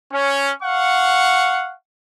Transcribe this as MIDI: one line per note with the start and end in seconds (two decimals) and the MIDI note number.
0.12 0.52 61
0.62 1.74 77
0.62 1.74 78
0.62 1.74 85